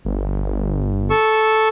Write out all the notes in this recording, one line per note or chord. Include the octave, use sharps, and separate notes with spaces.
G1
A4 C#6 E6